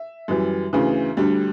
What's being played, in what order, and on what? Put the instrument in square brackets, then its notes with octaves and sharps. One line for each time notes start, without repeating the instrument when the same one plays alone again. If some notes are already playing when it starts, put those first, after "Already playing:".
Already playing: [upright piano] E5
F#2 E3 G3
D2 C#3 E3
D2 D3 G3